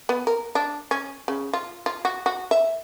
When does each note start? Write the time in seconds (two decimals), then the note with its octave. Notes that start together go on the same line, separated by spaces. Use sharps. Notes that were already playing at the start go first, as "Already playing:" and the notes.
0.09 B3
0.27 A#4
0.55 D4
0.91 C#4
1.28 C#3
1.53 F4
1.86 F4
2.05 F#4
2.26 F#4
2.51 E5